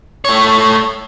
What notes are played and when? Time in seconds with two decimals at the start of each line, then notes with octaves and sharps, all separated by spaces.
0.25 A3 C#5